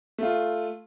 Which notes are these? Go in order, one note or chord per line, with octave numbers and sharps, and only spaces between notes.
A3 F4